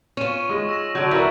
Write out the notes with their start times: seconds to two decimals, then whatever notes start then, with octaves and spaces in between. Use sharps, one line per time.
0.17 C#4 F4 C#6 D#7 E7
0.49 G#3 C#6
0.69 E6 A#6 E7
0.95 D3 F#3 G6 D7
1.11 C#4 E4 A#4 B4 G#6 A6